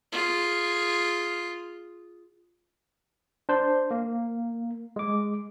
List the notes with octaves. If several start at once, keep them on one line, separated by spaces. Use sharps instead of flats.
F4 G#4
D4 C5
A#3
G#3 D6